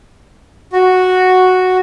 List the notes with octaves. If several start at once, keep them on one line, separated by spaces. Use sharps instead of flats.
F#4